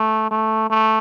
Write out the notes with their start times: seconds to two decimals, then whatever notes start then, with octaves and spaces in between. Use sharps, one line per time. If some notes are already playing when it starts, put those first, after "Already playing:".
Already playing: A3
0.31 A3
0.70 A3